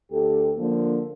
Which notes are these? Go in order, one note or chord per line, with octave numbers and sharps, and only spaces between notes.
D2 G4 A4
D3 F3 A#3